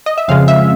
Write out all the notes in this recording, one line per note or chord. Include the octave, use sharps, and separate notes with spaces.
D#5
E5
F2 C#3 F3 G#3 C4 F5
E5